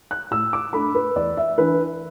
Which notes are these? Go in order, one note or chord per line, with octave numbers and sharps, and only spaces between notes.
F#6
A2 E6
D6
A3 D4 B5
B4
E2 D5
E5
E3 D4 B4